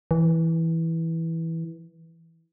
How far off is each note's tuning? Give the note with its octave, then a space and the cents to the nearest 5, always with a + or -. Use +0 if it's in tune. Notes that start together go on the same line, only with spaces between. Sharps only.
E3 -10